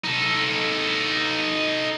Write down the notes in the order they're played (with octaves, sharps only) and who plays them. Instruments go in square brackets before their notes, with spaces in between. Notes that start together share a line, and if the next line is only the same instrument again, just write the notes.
[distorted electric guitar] D#4 A4